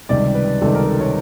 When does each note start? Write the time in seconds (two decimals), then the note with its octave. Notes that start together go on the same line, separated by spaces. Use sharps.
0.09 C#2 C3 D#3 G3 D5
0.35 B4
0.61 C#2 C3 D#3 G3 A4
0.75 A#4
0.88 A4
1.01 C#5